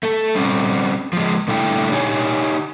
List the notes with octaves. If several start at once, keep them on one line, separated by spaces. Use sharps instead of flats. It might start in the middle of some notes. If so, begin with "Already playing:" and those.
A3 A4
G3 C4 C#4
F3 G#3
D3 G3 A3 E4 G5
D#4 G4 C#5 G#5